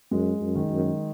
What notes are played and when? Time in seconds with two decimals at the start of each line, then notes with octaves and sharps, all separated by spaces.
0.11 F#2 G#3
0.40 F#2
0.55 D#3
0.70 F#2